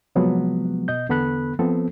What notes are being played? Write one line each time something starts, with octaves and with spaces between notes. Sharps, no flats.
C3 F3 F#3 G#3 B3
B2 D#5 G6
E2 D3 B3 A4 B5 F#6
F3 B3 C4 A4